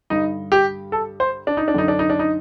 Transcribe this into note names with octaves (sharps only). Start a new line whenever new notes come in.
G2 D3 D#4
G4
A4
C5
D4
D#4
D4
F#2 D3 D#4
D4
D#4
D4
D#4